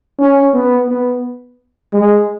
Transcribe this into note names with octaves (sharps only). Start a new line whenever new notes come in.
C#4
B3
B3
G#3